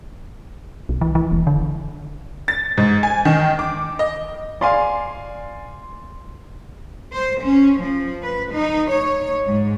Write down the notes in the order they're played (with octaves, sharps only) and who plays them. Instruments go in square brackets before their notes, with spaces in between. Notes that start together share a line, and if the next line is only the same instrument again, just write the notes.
[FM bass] B1
E3
E3
E1
D3
[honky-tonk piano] A6
G#2
G#5
D#3
D6
D#5
[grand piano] D5 F5 G#5 [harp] C6
[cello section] C5
C#4
F3
B4
D#4
C#5
G#2